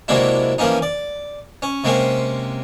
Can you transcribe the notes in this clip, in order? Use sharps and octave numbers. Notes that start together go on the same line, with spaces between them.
C3 F#3 G#3 A#3 D4 E4
E3 F3 A#3 C#4 D#4
D5
C#4
C3 G#3 A#3 C4 C#4